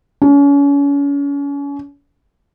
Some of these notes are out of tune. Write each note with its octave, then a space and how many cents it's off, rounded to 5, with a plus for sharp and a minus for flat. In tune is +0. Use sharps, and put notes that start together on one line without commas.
C#4 +35